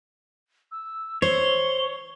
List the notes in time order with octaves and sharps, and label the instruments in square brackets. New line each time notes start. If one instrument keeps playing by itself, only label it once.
[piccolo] E6
[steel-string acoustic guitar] C5 [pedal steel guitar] C#5 [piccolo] G7